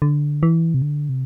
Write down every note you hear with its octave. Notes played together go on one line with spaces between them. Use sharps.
D3
E3
C3
D3
C3